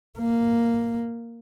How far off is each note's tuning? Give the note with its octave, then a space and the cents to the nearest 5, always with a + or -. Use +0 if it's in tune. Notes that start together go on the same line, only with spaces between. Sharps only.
A#3 -5